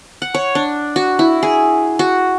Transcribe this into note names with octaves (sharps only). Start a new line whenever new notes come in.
F#5
C#5
D4
F#4
E4
G#4
F#4